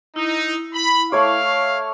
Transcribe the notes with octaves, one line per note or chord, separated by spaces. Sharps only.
D#4 E4
B5
A3 C#5 F5 D6